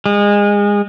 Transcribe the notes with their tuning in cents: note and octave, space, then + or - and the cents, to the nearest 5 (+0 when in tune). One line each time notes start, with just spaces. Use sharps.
G#3 -25